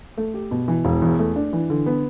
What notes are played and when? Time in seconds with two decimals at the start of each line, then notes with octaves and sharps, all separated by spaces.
0.18 A3
0.34 G4
0.51 B2
0.68 E3
0.85 E1
1.02 E2
1.19 A3
1.36 D4
1.53 E3
1.70 D3
1.86 B3